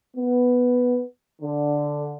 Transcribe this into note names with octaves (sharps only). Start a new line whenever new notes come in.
B3
D3